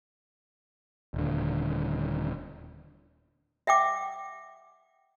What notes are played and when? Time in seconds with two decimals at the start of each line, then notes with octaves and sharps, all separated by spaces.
1.14 D#1 D3
3.67 E5 F#5 G5 D6